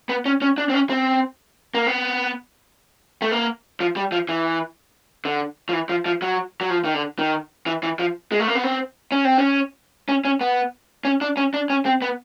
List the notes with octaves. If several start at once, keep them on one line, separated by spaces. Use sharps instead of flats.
B3
C#4
C#4
D4
C4
C#4
C4
A#3
B3
A3
A#3
F3
G3
F3
E3
D3
F3
E3
F3
F3
F#3
F#3
F3
D#3
D3
D#3
E3
E3
F3
G#3
A3
A#3
B3
C4
C#4
C4
C#4
C#4
C#4
B3
C#4
D4
C#4
D4
C#4
C4
B3